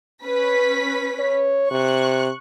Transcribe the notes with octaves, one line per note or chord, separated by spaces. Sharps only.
C#4 B4 B6
C#5
C3 C#6 F#6